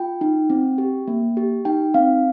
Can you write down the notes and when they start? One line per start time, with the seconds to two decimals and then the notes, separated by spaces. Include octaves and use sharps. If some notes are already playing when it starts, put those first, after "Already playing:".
Already playing: F4 G5
0.21 D#4
0.50 C4
0.78 G4
1.08 A#3
1.37 G4
1.65 D#4 G5
1.94 C4 F5